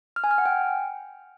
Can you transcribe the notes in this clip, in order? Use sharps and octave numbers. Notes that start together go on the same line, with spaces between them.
F6
G#5
F6
F#5
G5